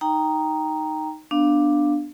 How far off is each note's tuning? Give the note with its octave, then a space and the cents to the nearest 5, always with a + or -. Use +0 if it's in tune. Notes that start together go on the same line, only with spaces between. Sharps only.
D#4 +0 G5 +0 A#5 +0
B3 +0 D4 +5 F5 +0